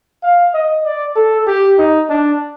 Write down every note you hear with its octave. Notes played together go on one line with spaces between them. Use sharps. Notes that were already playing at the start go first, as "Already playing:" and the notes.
F5
D#5
D5
A4
G4
D#4
D4